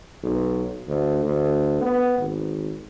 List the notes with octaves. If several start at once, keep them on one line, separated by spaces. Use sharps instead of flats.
B1
D2
D2
B3
G#1